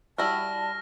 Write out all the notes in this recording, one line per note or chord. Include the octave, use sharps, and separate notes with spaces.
G3 E4 F#4 A5 F6 A#6